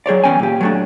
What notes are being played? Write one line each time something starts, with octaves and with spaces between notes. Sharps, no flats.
F#3 G#4 C#5 D5
E2 C#4 G5 G#5
A#2 G4
F#3 A3 D4